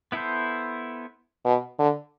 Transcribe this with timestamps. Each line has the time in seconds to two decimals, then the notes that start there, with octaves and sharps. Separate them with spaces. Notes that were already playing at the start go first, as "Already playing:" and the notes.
0.12 B3 E4 A4 C5
1.45 B2
1.79 D3